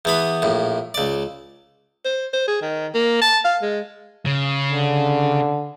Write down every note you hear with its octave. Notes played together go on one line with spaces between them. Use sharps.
E2 B3 B5
A#1 A2
C#2 D5
C5
C5
G#4
D#3
A#3
A5
F5
G#3
C#3
D3